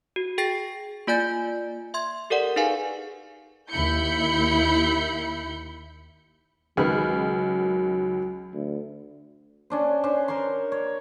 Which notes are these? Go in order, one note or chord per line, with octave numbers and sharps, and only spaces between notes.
F#4
G#4 G5 A6 A#6 C7
A#3 F4 D5 G#5 G6 A6
E5 C6 G#6
G4 A4 A#4 D5 F#5
D#4 G#4 B4 F5 G#5
D#2 E4 B5 G6 C#7
C#2 D#3 F#3 G#4 B4 F6
D2
C#4 D4 C5
C#4 D4 C5
A#4 C5 C#5 C6
C#5